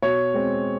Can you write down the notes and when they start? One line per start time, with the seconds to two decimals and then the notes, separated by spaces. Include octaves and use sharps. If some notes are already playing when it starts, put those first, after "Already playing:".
0.03 B2 C#5
0.34 G#3 C4